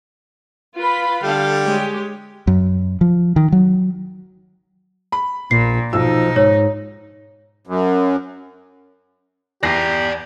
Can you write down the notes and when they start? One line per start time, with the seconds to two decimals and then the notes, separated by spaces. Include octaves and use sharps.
0.76 F4 B4 B5
1.23 D3 G3 A4 F5 G5
1.64 G#3 G4 C#5
2.47 F#2
3.01 F3
3.36 D#3
3.52 F#3
5.12 B5
5.51 A#1 A#2 C7
5.93 B1 F3 D#4 E6
6.36 G#2 C#5
7.67 F#2
9.63 E2 E4 G4 D5 A#5 A#6 C7